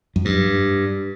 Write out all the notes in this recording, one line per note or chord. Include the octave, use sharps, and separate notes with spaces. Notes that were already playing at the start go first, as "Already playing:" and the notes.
F#2
G2